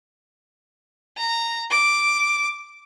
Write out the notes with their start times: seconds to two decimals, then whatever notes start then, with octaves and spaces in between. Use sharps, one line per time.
1.17 A#5
1.71 D6